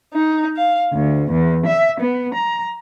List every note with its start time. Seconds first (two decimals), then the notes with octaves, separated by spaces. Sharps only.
0.13 D#4
0.56 F5
0.94 D2
1.32 E2
1.67 E5
2.02 B3
2.35 A#5